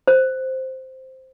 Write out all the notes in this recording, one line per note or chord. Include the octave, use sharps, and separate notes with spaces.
C5